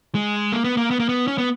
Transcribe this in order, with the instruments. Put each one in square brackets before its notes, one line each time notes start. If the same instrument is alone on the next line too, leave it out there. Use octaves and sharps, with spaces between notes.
[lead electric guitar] G#3
A#3
B3
A#3
B3
A#3
B3
C#4
B3